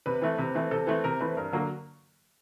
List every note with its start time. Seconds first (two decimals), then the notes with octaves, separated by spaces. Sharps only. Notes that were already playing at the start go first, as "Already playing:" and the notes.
0.06 C3 B4
0.22 E3 A3 C4
0.38 C3
0.55 E3 A3 C4
0.71 C3 A4
0.87 E3 A3 C4
1.04 C3 A#4
1.20 E3 A3 C4 B4
1.37 G2 A#4
1.52 D3 F#3 A#3